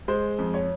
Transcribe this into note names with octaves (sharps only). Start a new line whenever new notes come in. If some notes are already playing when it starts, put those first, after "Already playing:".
G#3 C5
F2
C#5